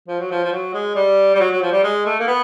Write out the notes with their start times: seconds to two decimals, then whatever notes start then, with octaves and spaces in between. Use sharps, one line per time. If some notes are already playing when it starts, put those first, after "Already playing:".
0.08 F3
0.20 F#3
0.31 F3
0.44 F3
0.52 F#3
0.74 G#3
0.96 G3
1.35 G3
1.40 F#3
1.51 F#3
1.62 F3
1.72 G3
1.83 G#3
2.06 A3
2.20 A#3
2.28 B3